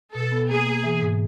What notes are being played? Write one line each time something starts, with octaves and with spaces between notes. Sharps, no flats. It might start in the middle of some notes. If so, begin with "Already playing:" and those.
B2 A4
B3
A#3 G#4
A#3
E3
G#2